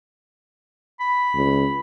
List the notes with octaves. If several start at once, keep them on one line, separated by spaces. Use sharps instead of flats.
B5
C#2